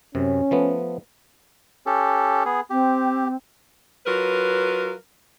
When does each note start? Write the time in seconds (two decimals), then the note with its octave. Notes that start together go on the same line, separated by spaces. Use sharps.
0.15 F#2 C3 C#4
0.51 F3 A3 B3
1.86 C#4 G4 A4
2.45 B3 G#4
2.70 C4 G4
4.06 F#3 F4 A#4 B4